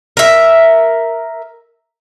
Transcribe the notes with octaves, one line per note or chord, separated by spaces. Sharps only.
A#4 E5